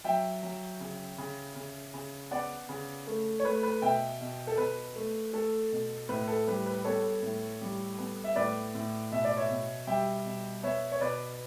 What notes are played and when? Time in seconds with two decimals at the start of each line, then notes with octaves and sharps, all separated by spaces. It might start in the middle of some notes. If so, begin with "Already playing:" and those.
0.04 F#3 E5 G5
0.43 F#3
0.80 C#3
1.18 C#3
1.55 C#3
1.94 C#3
2.31 B3 D5 F#5
2.69 C#3
3.07 A3
3.40 C#5
3.44 A3 B4
3.63 B4
3.82 B2 E5 G5
4.21 B2
4.47 A4
4.57 B2 B4
4.96 A3
5.33 A3 A4
5.72 B2
6.09 A2 B4
6.28 A4
6.47 G3 B4
6.66 B4
6.84 B3 A4 C#5
7.22 A2
7.61 G3
7.98 B3
8.24 E5
8.36 A2 B4 D5
8.75 A2
9.11 B2 E5
9.24 D5
9.37 C#5 E5
9.50 B2
9.87 G3 E5 G5
10.25 B2
10.63 B3 C#5 E5
10.92 C#5
11.01 B2 B4 D5